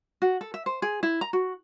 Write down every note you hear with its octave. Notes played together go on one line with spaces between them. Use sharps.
F#4
A4
E5
C5
G#4
E4
A#5
F#4